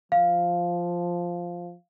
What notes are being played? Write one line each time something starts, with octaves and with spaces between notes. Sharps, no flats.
F3 F5